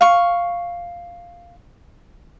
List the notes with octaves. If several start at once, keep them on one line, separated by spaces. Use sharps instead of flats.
F5 C#6